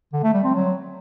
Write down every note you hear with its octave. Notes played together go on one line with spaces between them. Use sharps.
D3
A3
G3
C4
F#3